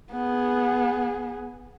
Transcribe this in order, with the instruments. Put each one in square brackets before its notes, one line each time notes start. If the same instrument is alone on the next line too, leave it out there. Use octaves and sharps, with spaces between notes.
[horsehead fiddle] B3 G#4